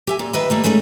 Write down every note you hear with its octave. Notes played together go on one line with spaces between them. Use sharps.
G4 E5 G#5
A#2
D#3 B4 D#5 E5
G3 A3 A#3
C#3 G#3 A3 D#4 G#4